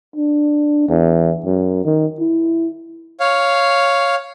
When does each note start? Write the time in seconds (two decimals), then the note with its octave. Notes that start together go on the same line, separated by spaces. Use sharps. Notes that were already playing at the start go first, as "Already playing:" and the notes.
0.16 D4
0.89 E2
1.45 F#2
1.85 D#3
2.20 E4
3.20 C#5 F5